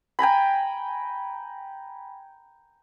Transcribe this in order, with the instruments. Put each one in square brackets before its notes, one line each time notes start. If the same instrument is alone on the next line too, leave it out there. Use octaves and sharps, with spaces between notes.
[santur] G5 G#5 A#5 B5